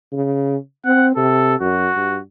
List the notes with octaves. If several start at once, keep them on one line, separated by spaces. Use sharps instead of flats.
C#3
C4 F#5
C3 A4
F#2 F#4
G2